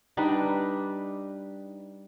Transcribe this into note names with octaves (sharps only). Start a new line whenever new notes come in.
G3 D4 D#4 B4